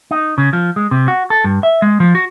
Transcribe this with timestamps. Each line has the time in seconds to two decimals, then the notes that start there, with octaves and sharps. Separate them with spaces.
0.11 D#4
0.38 C#3
0.53 F3
0.76 G#3
0.91 C3
1.08 F#4
1.30 A4
1.44 G2
1.63 E5
1.82 G#3
2.00 F3
2.15 F#4